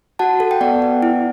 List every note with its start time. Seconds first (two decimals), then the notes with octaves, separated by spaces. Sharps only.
0.19 F#4 F#5 A5
0.40 A4
0.51 G5
0.61 B3 D5 F#5
0.82 B3
1.03 E4